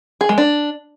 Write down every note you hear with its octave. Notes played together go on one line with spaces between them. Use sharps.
G#4
G#3
D4